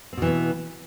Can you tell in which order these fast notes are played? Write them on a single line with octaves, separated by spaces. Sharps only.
C4 B2 E3 B3